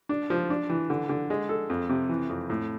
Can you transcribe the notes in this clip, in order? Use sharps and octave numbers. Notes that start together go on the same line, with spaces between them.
D4
F3
D4
E3
D3
D3
G#3
A4
F2
C3
E3
F2
A2